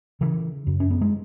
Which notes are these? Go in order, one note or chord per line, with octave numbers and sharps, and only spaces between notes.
C#3 E3
F#2
C#4
B3
G#3